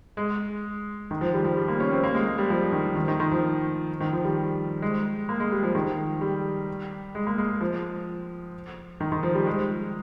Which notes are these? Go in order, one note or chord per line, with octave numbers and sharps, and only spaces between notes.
G#3
D#3
F3
G3
F3
G3
A#3
C#4
C4
A#3
G#3
G#3
G3
F3
D#3
D#3
D#3
D#3
F3
D#3
F3
G3
G#3
A#3
G#3
G3
F3
D#3
G3
G#3
A#3
G#3
F3
D#3
D#3
F3
G3
G#3